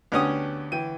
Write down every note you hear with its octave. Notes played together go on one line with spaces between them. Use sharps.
D2 B3 C#4 D4 G4 D#6
E3 G5 D#7